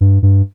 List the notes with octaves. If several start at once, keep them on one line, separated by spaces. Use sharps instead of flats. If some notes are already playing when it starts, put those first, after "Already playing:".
G2
G2